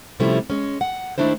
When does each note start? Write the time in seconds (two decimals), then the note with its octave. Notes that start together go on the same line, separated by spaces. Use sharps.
0.20 C3 F3 G3 A3 C#4 E4
0.50 G#3 C#4
0.81 F#5
1.18 D#3 F#3 A3 D4 E4 C5